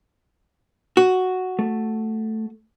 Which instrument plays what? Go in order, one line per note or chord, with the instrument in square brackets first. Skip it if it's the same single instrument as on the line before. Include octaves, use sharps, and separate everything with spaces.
[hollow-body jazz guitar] F#4
[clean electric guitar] A3